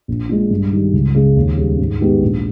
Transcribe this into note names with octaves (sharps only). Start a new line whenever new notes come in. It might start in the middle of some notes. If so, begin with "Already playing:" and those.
A#1
A#2 G#3
G2
D#3 G3
C#2
C#3 G#3
D#2
C#3 G3
G#2
D#3 G#3 B3 G4
A#1